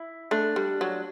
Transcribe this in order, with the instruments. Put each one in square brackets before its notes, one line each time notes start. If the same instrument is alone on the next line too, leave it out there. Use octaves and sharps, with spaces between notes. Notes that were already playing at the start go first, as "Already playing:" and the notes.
Already playing: [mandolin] E4
[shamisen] A3 [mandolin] D4
[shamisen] G3
F#3